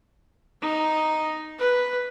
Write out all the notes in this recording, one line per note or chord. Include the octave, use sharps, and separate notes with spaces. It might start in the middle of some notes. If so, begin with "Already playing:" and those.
D#4
B4